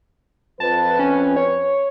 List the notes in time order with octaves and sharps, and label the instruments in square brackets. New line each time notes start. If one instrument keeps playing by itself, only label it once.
[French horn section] F2 F3 B4 [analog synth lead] A5
[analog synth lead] C#4
C#5